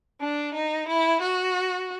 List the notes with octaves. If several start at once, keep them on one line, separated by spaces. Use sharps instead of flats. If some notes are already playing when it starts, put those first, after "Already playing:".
D4
D#4
E4
F#4